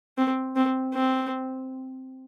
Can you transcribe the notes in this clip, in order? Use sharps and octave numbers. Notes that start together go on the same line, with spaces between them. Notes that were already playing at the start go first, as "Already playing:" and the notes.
C4
C4
C4